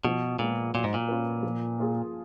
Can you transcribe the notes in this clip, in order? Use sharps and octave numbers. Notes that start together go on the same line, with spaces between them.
B2 F3
A#2 G#3 B3
A#2 F#3
G#2
A#2
C#4 F4 B4
F3
A#3 F4 G#4